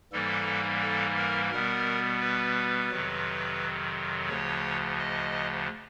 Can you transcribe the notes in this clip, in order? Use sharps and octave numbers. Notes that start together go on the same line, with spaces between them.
G#2 E3 G3 A#3 A4
A4
A#4
B2 G3 B3 A#4
B4
F2 C3 D#3 F#3
D2 C#3 F3 C#5
D#5